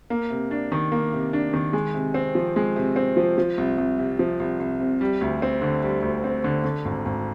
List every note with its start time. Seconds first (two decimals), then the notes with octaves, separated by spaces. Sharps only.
0.10 A#3
0.30 C3
0.51 D4
0.72 D#3
0.92 A#3
1.13 C3
1.33 D4
1.54 D#3
1.73 G#3
1.94 C3
2.14 C4
2.35 F3
2.56 G#3
2.76 C3
2.96 C4
3.17 F3
3.38 F3
3.58 C2
3.78 C2
3.99 C3
4.19 F3
4.40 C2
4.59 C2
4.80 C3
5.01 G3
5.21 D2
5.42 C4
5.62 D3
5.83 G3
6.03 D2
6.24 C4
6.44 D3
6.64 D3
6.85 G#1
7.05 G#1